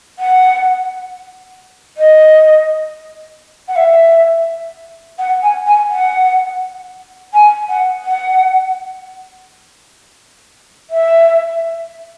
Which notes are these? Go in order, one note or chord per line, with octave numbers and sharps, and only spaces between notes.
F#5
D#5
F#5
E5
F#5
G#5
G#5
F#5
G#5
F#5
F#5
E5